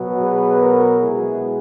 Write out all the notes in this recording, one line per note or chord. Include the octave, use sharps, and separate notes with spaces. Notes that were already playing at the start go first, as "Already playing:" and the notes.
Already playing: B2 F#3 B3
G#4 B4
F#4 A#4
B2 G#3 B3 E4 G#4